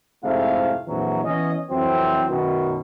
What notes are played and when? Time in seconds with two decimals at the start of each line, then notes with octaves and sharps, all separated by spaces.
0.24 F2 G#2 C3 A3 E4 F5
0.87 A#1 F2 E3 F#3
1.24 E3 B3 C#4 D#5
1.70 F2 E3 F#3 C4
2.29 F#2 B2 D#3